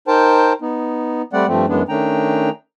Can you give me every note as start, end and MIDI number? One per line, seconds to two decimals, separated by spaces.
0.08 0.53 63
0.08 0.53 70
0.08 0.53 72
0.08 0.53 79
0.08 0.53 81
0.62 1.22 59
0.62 1.22 63
1.33 1.47 55
1.33 1.47 57
1.33 1.47 60
1.33 1.47 74
1.33 1.47 78
1.47 1.66 43
1.47 1.66 53
1.47 1.66 57
1.47 1.66 60
1.68 1.82 42
1.68 1.82 52
1.68 1.82 56
1.68 1.82 59
1.68 1.82 62
1.89 2.50 51
1.89 2.50 57
1.89 2.50 61
1.89 2.50 62
1.89 2.50 79
1.89 2.50 82